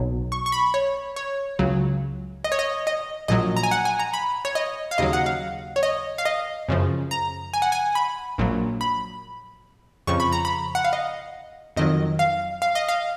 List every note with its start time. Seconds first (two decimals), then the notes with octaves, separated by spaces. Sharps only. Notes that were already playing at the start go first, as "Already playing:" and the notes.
Already playing: B1 B2 F#3
0.32 C#6
0.46 C#6
0.52 B5
0.74 C#5
1.16 C#5
1.59 C#2 C#3 F#3
2.44 D#5
2.52 C#5
2.59 D#5
2.87 D#5
3.28 A#1 A#2 F#3 D#5
3.57 A#5
3.63 G#5
3.71 F#5
3.85 G#5
3.99 A#5
4.14 B5
4.45 C#5
4.55 D#5
4.91 F5
4.98 D#2 C#3 F#3 D#5
5.13 F#5
5.26 F5
5.76 C#5
5.83 D#5
6.18 F5
6.25 D#5
6.69 F#2 C#3 F3
7.11 A#5
7.53 G#5
7.62 F#5
7.72 G#5
7.95 B5
8.38 A#1 A#2 F#3
8.81 B5
10.07 F2 C#3 F3 C#6
10.20 B5
10.32 A#5
10.45 B5
10.75 F#5
10.85 F5
10.93 D#5
11.77 F2 D#3 F#3 D#5
12.19 F5
12.62 F5
12.75 D#5
12.89 F5